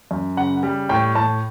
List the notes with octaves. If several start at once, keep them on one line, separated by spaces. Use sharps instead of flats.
F#2
C#3 F#5
G3
A2 G5
A2 A5